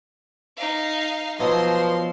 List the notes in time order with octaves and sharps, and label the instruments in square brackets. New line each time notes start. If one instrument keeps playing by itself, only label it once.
[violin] D#4 F5
[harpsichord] B2 F#3 [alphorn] F3 [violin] C6